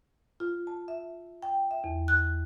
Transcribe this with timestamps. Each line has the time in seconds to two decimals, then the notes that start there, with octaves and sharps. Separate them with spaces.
0.40 F4
0.67 A5
0.88 E5
1.43 G5
1.71 E5
1.84 E2
2.08 F#6